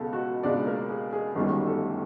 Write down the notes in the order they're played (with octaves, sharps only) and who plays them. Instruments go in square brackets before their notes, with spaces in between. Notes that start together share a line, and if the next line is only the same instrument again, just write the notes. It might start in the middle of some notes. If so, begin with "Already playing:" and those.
Already playing: [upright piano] C#2 B2 G#3 A4 A5
F#4 F#5
C#2 B2 G#3 D4 D5
A#3 A#4
G#4
G#4
G1 F#2 D#3 G3 G#4
A3 A4
G4